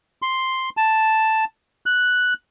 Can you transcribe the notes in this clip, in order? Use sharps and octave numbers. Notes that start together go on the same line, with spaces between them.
C6
A5
F#6